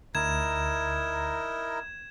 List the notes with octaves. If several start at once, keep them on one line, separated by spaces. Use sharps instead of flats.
D2 D#4 E4 A#4 G#6 E7